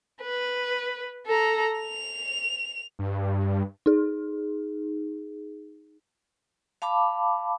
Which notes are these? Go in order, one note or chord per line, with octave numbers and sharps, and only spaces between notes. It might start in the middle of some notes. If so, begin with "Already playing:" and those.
B4
A4 A#5
F7
G2
D#4 G#4
F5 A5 B5 D6